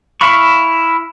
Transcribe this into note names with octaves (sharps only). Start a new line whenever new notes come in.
E4 E5 F5 B5 C#6